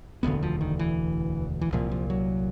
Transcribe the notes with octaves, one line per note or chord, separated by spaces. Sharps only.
E1 D2 D3 B3
F3
D#3
E3
E3
C2 A#2 F3
F3
F#3